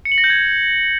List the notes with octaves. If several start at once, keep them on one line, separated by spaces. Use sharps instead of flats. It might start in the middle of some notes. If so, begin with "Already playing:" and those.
C#7
F#7
A#6
G6
G#6